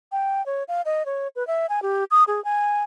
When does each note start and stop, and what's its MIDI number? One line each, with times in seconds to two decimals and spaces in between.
0.12 0.44 79
0.46 0.63 73
0.68 0.82 77
0.85 1.05 75
1.06 1.28 73
1.36 1.45 71
1.47 1.66 76
1.69 1.82 80
1.82 2.04 67
2.11 2.24 87
2.28 2.43 68
2.45 2.83 80